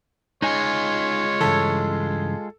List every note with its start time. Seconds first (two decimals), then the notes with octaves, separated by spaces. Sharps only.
0.42 G#3 D#4 F4 C#5 D#5 G#5
1.41 G2 C#3 E3 A4